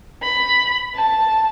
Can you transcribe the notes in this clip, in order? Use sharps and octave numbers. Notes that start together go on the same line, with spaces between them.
B5
A5